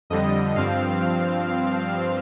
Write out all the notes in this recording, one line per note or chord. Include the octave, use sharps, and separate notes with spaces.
F2 D3 G3 D#5
G2 F3 C4 F5